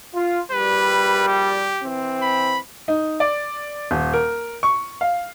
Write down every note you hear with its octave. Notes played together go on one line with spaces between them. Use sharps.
F4
A#1 G3 B4
G4
E3 C4
B5
D#4
D5
D#1
A#4
C#6
F5